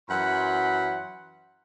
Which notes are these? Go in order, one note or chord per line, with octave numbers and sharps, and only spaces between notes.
F#2 E3 F#3 F#5 B5 C6